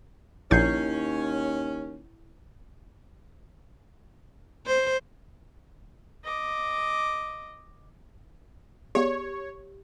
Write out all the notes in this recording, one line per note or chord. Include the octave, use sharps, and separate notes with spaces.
A#1 D#2 C#4 E4 C#6 G6 G#6 C7
C5
D#5 D6
B3 G4 G#4 C#5 D5